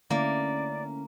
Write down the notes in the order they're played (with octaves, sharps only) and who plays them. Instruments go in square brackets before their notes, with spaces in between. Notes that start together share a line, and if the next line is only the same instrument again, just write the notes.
[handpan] D3 A3 E4 [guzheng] A#3 [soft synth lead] C#4 [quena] D5